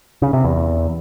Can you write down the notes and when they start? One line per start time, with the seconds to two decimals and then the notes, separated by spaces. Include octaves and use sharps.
0.22 C#3
0.33 C3
0.44 E2